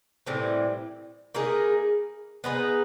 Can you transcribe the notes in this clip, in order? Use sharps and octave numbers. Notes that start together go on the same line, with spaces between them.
A2 E3 G3 C4
A#3 D#4 G#4 B4
B3 D#4 G#4 B4